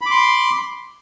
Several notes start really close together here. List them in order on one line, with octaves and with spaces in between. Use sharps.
B5 D6 C6